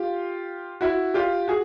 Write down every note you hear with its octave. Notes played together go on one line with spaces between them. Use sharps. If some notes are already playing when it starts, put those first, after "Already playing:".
Already playing: F4 G4
E4 F#4
F4 G4
F#4 G#4